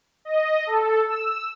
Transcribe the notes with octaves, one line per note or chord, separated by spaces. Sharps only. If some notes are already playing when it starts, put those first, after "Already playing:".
D#5
A4
E6